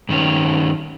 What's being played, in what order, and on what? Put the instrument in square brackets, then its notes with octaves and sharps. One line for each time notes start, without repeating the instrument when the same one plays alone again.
[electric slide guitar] G2 D#3 C#4